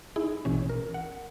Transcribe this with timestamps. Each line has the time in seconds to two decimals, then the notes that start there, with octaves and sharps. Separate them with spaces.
0.16 D#4 E4 G#4
0.45 A#1 B2 E3 C#4
0.69 A#4
0.94 F#5